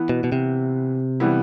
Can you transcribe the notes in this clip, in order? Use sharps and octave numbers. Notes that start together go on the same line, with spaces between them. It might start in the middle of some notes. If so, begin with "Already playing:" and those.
Already playing: E3 B3 E4
B2
B2
C3
E3 G3 B3 E4